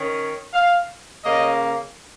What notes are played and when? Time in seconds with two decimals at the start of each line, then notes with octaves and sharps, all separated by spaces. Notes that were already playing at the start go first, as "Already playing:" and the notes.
Already playing: D#3 C#4
0.53 F5
1.24 C#3 A#3 C#4 D#5